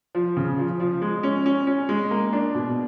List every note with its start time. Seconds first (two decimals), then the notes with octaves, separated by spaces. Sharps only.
0.15 F3
0.37 C#3
0.58 F3
0.80 F3
1.02 G#3
1.23 C#4
1.46 C#4
1.67 C#4
1.89 G#3
2.11 A#3
2.33 D4
2.55 B2